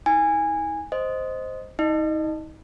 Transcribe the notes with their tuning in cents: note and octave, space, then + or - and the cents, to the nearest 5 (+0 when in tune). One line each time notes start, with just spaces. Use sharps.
D#4 +45 G#5 -15
C5 +0 D#5 +0
D#4 +35 D#5 -30